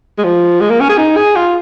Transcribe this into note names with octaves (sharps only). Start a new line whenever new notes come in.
G#3
F3
G#3
A#3
C#4
G#4
D#4
G#4
F4